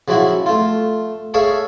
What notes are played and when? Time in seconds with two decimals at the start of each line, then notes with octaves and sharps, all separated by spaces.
0.08 C#3 F3 F#3 E4 F#4
0.46 A3 F4
1.34 G#4 A4 C#5 E5 F5